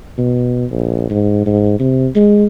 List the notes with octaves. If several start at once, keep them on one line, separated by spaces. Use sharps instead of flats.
B2
A#1
G#2
G#2
C3
G#3